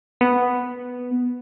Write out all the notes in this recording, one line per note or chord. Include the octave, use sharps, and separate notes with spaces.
B3